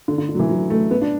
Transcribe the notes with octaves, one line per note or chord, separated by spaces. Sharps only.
D3
D3
D3
F#3
E3
F#3
A3
B3
D4